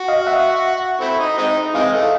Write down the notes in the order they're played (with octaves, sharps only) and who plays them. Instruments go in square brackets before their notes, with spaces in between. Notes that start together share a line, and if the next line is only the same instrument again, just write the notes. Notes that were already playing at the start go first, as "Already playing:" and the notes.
Already playing: [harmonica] F#4
[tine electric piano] D#5 F5
E5 F#5
[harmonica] A3 C4 E4
D#4
G#3 C4 D#4
[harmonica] C3 E3 G#3 [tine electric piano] D#5 F5
[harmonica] A3